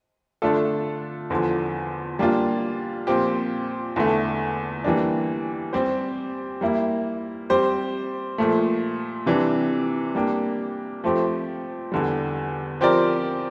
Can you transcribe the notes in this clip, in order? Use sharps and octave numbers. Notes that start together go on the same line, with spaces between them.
D3 A3 D4 F4 A4
E2 D3 F3
G3 A#3 D4 F4
A#2 F3 C4 G4
E2 D3 A3
E3 G3 A#3 D4
G3 C4 G4 C5
G3 A#3 E4
G3 C4 G4 C5
A#2 F3 A3
C3 E3 G3 D4
G3 A#3 D4 G4
F3 A3 C4 G4
E2 D3 G3
F3 C4 G4 A#4 D5